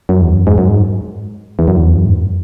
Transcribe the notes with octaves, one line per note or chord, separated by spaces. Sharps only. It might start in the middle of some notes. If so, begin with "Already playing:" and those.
F#2
E2
F#2
G#2
F#2
G#2
E2
F#2
E2
F#2
G#2
F#2